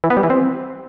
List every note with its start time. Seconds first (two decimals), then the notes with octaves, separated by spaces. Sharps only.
0.04 E3
0.10 B3
0.17 G3
0.23 E3
0.30 C4